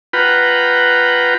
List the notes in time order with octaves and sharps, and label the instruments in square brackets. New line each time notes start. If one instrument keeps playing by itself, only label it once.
[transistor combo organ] F4 B4 F#5 G5 A#5 B5